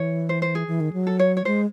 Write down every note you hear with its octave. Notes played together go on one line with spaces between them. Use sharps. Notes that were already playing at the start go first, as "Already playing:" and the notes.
Already playing: E3 C#5
C5
C5
G#4
E3
D#3
F#3
A4
C#5
C#5
G#3 C5